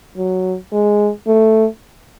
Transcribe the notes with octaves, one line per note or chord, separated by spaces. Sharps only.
F#3
G#3
A3